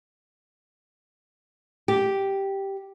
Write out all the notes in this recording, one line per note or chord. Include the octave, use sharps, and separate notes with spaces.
G4